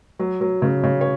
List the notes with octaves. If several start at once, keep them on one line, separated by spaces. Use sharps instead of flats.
F#3
F#3
C#3
C#3
C#5